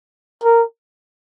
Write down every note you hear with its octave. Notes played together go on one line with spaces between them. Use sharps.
A#4